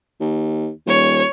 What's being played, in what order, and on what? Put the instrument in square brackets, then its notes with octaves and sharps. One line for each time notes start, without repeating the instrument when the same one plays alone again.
[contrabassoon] D#2
[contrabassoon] D#1 [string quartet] C#5